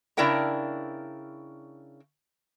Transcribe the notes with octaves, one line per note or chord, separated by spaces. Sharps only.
C#3 D4 E4 A#4 G5 A#5